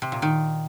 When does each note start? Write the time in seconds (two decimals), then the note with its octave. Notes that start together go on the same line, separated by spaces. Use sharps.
0.02 C3
0.12 A#2
0.22 D#3